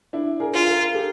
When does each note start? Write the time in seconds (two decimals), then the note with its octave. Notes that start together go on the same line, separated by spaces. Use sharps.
0.13 D4 E4
0.40 G#4 A#4
0.53 F4
0.67 A4
0.81 A#4
0.94 G4 A4